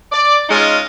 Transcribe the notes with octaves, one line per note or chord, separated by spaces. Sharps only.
D5
G#3 C#4 D#4 F4 D#5